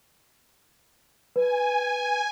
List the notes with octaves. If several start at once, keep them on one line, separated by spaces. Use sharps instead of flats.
B4 G#5